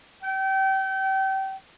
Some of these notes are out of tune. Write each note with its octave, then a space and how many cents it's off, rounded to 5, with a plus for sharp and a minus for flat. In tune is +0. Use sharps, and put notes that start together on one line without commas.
G5 -30